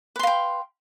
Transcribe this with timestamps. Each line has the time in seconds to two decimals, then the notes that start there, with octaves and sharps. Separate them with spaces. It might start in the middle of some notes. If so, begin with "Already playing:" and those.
0.16 B4
0.19 C6
0.23 F5
0.27 G5